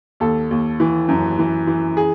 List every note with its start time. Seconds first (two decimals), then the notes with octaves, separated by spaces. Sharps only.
0.20 D#2 A4
0.51 D#2
0.80 E3
1.08 F#2
1.39 E3
1.67 E3
1.97 G#4